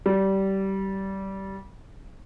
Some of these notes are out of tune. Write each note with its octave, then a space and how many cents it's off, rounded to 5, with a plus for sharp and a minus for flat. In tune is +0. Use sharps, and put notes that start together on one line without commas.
G3 -20